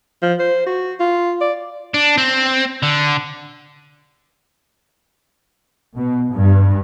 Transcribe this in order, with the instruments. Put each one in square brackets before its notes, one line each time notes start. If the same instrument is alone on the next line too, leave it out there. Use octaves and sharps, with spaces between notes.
[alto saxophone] F3
C5
F#4
F4
D5
[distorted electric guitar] D4
C4
D3
[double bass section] B2
G2